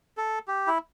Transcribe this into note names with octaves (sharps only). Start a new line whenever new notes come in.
A4
G4
E4